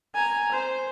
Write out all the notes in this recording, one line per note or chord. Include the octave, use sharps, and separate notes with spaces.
G#5 A#5
C5